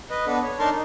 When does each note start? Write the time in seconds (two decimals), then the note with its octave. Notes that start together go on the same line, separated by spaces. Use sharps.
0.10 B4 D#5
0.27 B3 D4 A4 B4
0.43 C#5
0.59 D4 D#4 A#4 A5 C6 C#6
0.71 D#4